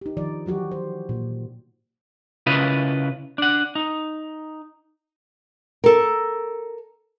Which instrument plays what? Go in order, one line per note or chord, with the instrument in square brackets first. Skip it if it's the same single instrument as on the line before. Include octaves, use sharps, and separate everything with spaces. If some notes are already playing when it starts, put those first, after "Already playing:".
[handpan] D#4 G4
D#3 F3 D5
E3 F#3 F#4 G4
C5
A#2
[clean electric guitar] C#3 E4 F4 B4 D#5
D4 F#5
D#4
[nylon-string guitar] A4 A#4